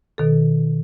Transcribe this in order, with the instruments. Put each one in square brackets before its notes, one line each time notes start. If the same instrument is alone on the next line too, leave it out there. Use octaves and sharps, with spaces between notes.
[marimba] B2 D#3 A4